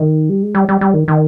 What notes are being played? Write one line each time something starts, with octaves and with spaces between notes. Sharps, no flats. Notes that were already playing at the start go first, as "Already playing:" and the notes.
Already playing: D#3
G3
G#3
G3
G3
G3
D#3
D#3